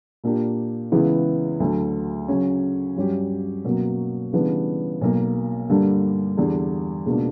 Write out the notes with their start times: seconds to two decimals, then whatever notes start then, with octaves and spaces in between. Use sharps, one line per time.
0.24 A#2 A#3 D4 G4
0.92 C#2 C#3 E3 B3 E4
1.60 D2 D3 F#3
2.28 C#3 F#3 C#4
2.96 G2 F#3 C#4 G4
3.65 B2 F#3 A#3 C#4
4.33 C#3 E3 G3 B3 D4
5.01 B1 B2 A#3
5.69 G2 D3 G3 A#3 D4
6.37 E2 D3 G3
7.06 C#2 B2 A#3 D4